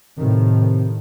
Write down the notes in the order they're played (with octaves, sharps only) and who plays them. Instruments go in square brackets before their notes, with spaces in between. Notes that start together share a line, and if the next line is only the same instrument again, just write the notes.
[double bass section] A2 D#3 [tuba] C3